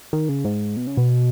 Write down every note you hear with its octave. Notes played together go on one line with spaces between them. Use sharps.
D#3
C#3
G#2
B2
C#3
B2